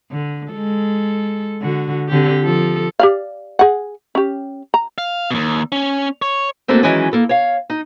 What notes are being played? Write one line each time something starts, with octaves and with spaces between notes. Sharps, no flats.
D3
G#3 A4
D3 F#4
D3 C4 G4
F3 A4
G4 D5 F5
G#4 F#5
C#4 G4
A#5
F5
D#2 B2
C#4
C#5
A3 A#3 C4 D4 F#4 A4
D#3 E3 F#3 G#3 C#4
A#3 A4
C#5 F5
D#4